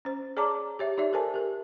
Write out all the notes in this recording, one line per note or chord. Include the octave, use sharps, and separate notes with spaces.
C#4 C5
G#4 C#5 D5 A5 A#5 D6
G4 C#5 E5
D#4 G4 D5 E5
A4 A#4 C5 G#5 A5
G4 A#4